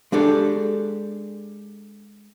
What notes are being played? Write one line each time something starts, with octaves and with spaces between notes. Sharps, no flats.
G#3 D4 G4 A4